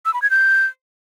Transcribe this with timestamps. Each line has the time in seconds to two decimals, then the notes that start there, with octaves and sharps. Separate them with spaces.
0.05 E6
0.14 B5
0.22 G#6
0.30 G6